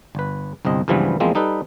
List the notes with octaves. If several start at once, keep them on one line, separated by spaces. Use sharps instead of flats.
G1 B4
G1 C2 C4 D#5
C#2 G2 E3 F3 G3 B3
E2 F3 G#3 A#3 C4
G3 D#4 A4 B4